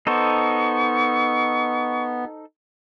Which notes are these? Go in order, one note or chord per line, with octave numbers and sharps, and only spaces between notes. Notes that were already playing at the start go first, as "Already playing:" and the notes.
B3 D#4 A4 C5 C#6